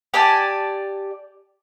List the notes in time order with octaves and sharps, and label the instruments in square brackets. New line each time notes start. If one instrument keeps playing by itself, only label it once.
[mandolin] G4 D5 G#5 A5